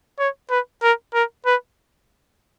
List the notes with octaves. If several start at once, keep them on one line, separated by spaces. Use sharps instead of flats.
C#5
B4
A#4
A#4
B4